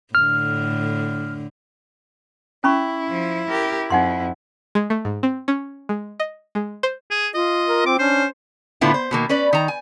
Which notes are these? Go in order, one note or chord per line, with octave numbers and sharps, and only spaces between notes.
A2 D3 F6
C#4 E4 B5 C#6
F3
G4 A#4
F2 D#4 F#5 C6
G#3
A3
G#2
C4
C#4
G#3
D#5
G#3
C5
G#4
F4 D#5
A#4
C4 D6
C#4 D4 C5
A2 D3 B3 E4 F4
C5
B2 D#3 A#3
C#4 B4 D5
D#3 A#5
G#5